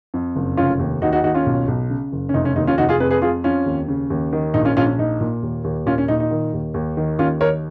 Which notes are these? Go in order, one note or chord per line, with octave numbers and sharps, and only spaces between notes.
F2
F#1
F1 C#4 F4
D#2
D#2 D#4 F#4
D#4 F#4
D#2 D#4 F#4
C#4 F4
B1
B1
C#3
F#1
C#4
F1 D#4
C#4
D#2 D#4
C#4 F4
F1 D#4 F#4
F4 G#4
F2 G#4 B4
G#4 B4
F2 F4 G#4
F2 C#4 F4
D#2
C#3
D#2
D#3
A#1 D#4
C#4 F4
A#1 C#4 F4
C#4
A#2 D#4
A#2
D#2
D#2
A#2 C#4 F4
C#4
A#2 D#4
D#4
D#3
D#2
D#2
D#3
D#2 C#4 F4
D#3 A#4 C#5